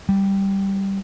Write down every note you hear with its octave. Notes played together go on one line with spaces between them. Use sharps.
G3